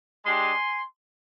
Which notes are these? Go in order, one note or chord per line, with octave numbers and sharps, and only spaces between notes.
G#3 D4 G4 G#5 C6